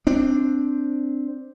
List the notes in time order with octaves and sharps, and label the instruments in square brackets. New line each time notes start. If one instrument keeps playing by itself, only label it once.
[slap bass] C4 D4